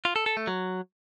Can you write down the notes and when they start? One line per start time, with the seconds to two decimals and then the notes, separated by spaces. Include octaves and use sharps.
0.05 F4
0.16 A4
0.26 A4
0.37 A3
0.47 F#3